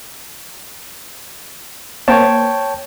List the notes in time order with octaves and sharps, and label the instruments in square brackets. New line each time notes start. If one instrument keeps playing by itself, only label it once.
[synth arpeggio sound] A#3 C5 [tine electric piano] C#5 G5 A5